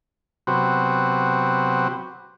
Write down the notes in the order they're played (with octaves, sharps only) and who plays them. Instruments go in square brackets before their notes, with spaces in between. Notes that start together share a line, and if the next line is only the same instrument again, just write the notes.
[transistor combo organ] C3 F#3 B3 C4 F#4 G4